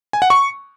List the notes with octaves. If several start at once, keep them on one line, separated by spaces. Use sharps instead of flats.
G#5
F#5
C#6